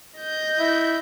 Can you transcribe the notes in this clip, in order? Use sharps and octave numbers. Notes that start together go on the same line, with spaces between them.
D#5 G6
E4